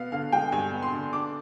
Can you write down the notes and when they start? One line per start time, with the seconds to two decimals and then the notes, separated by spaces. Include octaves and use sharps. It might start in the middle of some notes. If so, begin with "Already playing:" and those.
Already playing: B2 B3 F5
0.12 D3 F5
0.32 G#3 G5
0.52 G2 G#5
0.72 B3
0.82 C6
0.93 D3
1.13 D4 D6